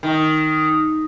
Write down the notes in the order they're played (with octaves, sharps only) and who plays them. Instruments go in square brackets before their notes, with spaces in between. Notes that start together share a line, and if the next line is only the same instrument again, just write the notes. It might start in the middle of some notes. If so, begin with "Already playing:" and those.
[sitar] D#3